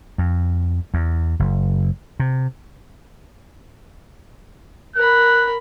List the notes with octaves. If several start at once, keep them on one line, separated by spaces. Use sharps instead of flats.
F2
E2
F#1
C3
A#4 B5 F#6